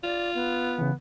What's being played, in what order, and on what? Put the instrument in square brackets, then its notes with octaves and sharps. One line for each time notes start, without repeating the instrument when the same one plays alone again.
[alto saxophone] F4 [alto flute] D5
[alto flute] B3
[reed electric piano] C#3 E3